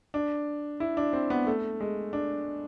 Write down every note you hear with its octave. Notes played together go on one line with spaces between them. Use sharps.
D4
E4
D4
C4
B3
A3
G#3
D4